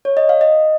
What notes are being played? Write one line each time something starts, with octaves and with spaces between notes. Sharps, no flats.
C#5
D#5
F5
D#5